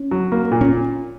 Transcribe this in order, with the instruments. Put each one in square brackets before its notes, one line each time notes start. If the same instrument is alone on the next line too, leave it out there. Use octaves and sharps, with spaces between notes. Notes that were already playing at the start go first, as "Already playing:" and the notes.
Already playing: [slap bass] C#4
[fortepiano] F#3
A#3
A#2
[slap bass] C#4